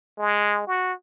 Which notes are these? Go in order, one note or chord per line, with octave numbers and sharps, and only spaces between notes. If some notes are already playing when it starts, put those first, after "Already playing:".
G#3
F#4